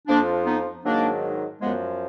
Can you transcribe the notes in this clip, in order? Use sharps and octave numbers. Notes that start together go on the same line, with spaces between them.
F2 F3 A#3 D4
B3 D#4
G#2 D#3 F#3 A#3 D4
F#2 F3 G#3 B3